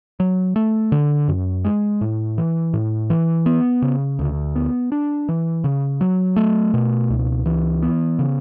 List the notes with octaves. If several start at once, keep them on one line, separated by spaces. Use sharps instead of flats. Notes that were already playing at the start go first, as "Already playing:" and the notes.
F#3
A3
D3
F#2
G#3
A2
E3
A2
E3
B3
C#3
D2
B3
D4
E3
C#3
F#3
A3
B2
C#2
E3
B3
C#3